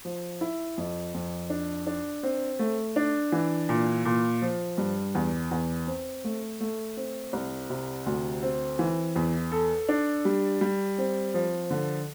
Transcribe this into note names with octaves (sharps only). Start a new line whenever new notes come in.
F3
E4
F2
F2
D4
D4
C4
A3
D4
E3
A#2
A#2
F3
G2
E2
E2
C4
A3
A3
C4
C2
C3
D2
C4
E3
E2
A4
D4
G3
G3
C4
F3
D3